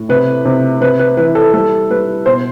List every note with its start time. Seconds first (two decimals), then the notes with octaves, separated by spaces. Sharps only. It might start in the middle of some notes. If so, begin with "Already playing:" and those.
Already playing: A2
0.09 C3 B4
0.45 C3
0.81 C3 B4
0.99 B4
1.17 E3 B4
1.35 A4
1.53 G3 A4
1.90 G3 B4
2.26 B2 C5